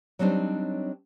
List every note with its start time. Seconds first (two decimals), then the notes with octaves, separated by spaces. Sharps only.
0.19 F#3 G3 C4 D4 D#4